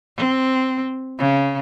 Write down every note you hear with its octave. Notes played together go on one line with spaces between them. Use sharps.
C4
C#3